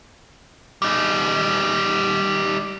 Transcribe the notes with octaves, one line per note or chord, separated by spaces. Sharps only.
G3 D#4